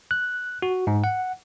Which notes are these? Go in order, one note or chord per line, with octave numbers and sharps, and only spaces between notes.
F#6
F#4
G#2
F#5